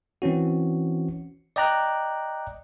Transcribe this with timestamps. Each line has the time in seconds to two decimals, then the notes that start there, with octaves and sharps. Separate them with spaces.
0.22 E3 C4 C#4 F#4
1.56 D5 D#5 G5 A#5 D6 F#6